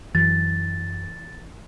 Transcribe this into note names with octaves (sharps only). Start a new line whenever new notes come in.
F#2 E3 A6